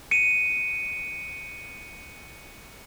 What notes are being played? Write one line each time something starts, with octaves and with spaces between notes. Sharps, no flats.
C#7 D#7